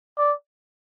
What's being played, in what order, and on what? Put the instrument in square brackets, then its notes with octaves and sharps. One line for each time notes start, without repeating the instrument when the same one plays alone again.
[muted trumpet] D5